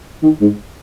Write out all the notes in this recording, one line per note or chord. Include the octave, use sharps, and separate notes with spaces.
D#3
G#2